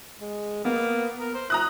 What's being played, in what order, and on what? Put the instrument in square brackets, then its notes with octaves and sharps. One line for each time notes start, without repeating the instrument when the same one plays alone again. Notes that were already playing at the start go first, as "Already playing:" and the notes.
[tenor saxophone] G#3
[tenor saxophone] A#3 [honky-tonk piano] B3
[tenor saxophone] A#4
C5
[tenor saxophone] E4 [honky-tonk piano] A#5 D#6 F#6